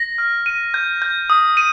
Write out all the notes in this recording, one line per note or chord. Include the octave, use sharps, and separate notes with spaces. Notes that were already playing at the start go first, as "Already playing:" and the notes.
Already playing: A#6
F6
D#7
G6
G6
D#6
D#7